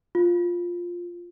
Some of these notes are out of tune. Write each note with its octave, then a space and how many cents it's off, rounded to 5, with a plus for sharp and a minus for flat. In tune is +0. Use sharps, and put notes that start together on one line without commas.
F4 +5